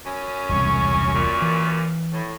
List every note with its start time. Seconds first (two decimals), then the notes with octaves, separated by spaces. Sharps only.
0.05 F#2 C#4
0.49 E1 C2 C#6
1.14 F#2 A#2
1.42 E3
2.13 A2